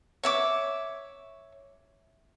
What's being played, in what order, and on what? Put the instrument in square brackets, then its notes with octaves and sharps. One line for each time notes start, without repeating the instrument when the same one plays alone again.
[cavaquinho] C#5 E5 D6